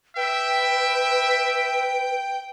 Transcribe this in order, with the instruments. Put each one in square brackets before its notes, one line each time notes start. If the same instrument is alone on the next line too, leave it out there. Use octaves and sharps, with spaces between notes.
[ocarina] B4 [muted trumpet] E5 [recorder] G5